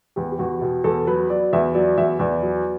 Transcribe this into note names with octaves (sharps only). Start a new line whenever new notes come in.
E2 G4
G4
E2 F#4
B2 G4
E2 A4
F#3 B4
F#3 D5
E2 E5
F#3 D5
E2 E5
E2 D5
F#3